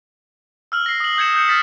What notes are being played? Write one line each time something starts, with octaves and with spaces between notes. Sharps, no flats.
E6 F6 F#7
A#6 C7
D#6 F#7
D#6 G6 G#6 C#7 E7
D#6 G6 C#7
E6 F6 A6 B6 C#7